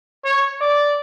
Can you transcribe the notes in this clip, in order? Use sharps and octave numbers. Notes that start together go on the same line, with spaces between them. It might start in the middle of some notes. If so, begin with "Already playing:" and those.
C#5
D5